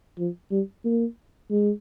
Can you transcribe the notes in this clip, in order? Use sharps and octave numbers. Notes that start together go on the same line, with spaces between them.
F3
G3
A#3
G#3